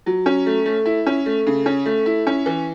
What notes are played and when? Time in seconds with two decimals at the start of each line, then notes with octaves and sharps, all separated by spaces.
0.06 F#3
0.26 C#4
0.46 A3
0.66 A3
0.86 E4
1.06 C#4
1.26 A3
1.47 C#3
1.66 C#4
1.86 A3
2.06 E4
2.27 C#4
2.46 E3